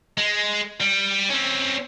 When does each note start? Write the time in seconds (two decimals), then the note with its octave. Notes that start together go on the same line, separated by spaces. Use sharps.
0.17 G#3
0.80 G3
1.29 C4 C#4